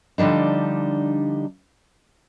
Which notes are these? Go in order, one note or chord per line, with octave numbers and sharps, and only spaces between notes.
D3 F3 G3 D4 D#4